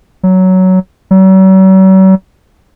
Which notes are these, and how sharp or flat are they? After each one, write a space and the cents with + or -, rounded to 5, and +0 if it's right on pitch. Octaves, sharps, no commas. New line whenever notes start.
F#3 +10
F#3 +45